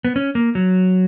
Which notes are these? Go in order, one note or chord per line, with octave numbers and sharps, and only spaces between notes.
B3
C#4
A#3
F#3